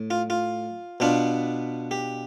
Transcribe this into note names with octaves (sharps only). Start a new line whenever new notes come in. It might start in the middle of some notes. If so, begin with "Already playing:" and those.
Already playing: A2
F4
F4
B2 B3 D4 F4
G4